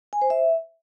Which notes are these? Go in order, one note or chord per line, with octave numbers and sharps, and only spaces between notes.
G#5
C5
E5